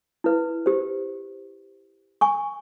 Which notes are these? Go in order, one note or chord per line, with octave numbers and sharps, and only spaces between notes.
E4 B4
G4 C5
G#5 C#6